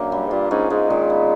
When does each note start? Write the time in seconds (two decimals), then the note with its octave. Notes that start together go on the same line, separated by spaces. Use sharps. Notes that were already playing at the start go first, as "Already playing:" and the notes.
Already playing: F#2 D3 A#3
0.12 G3
0.26 G#2
0.31 G2 F4
0.51 G#2 C#4
0.70 G#2 G#3
0.90 A#2 D#3
1.10 B3